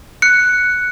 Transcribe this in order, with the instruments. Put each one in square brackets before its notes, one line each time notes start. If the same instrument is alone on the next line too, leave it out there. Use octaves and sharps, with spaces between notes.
[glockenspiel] F#6 C#7